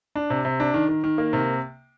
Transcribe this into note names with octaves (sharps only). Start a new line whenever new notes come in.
D4
C3
C3
D4
D#3
D#3
D#3
A#3
C3